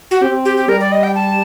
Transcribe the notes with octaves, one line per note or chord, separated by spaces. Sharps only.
F#4
C4 G4
G4
G4
G3 A#4
D5
D#5
G5
A5